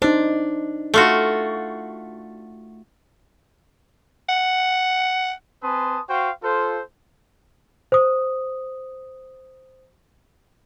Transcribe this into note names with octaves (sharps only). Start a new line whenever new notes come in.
D4 D#4 C5
A3 F4 F#4
F#5
C4 B4 G#5 A5 C6 D#6
F#4 C5 F5 G5 C#6
F4 A4 C5
C5 D#6